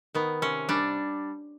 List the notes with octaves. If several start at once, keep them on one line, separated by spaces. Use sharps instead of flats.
D#3 B3
C3 C#4
G3 D4